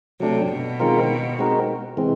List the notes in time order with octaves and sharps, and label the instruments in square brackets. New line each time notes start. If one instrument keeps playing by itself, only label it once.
[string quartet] C3 [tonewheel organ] F#3 A3 D4
[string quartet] B2
[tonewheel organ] D#3 G#3 C4 F4 A#4
G#3 C4 D#4 F#4 A#4
C3 E3 G#3 C4